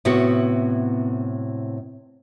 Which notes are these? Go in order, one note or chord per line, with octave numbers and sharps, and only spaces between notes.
A2 C3 B3 E4 F#4 F#5